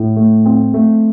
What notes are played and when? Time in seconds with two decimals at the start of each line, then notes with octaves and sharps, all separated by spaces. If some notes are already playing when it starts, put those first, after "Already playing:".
Already playing: A2
0.16 A3
0.45 C4
0.74 A3